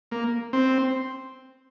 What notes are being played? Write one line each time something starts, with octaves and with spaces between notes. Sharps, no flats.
A#3
C4